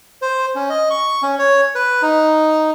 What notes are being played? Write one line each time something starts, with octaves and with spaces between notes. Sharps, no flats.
C5
C#4
D#5
C#6
C#4
C#5
B4
D#4